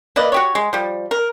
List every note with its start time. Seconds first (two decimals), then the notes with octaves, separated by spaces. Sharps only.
0.16 A#3 B4 D5 D#5
0.32 F#4 G4 C#5
0.55 G#3
0.73 F3 G3
1.11 A#4